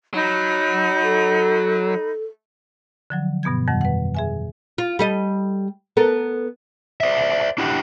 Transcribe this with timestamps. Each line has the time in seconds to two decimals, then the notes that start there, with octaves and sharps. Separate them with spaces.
0.14 F#3 D#4 B5
1.03 A4
3.10 D3 F3 F#3
3.43 G2 B2 B3 G6 G#6
3.68 F2 D#3 G3 F#5
3.81 B4 F#5
4.15 G#4 E5 G#5
4.78 F4
4.99 G3 A4 D#5
5.97 B3 A4 A#4
7.00 C5 D5 E5
7.58 D4 E4 G4 F#5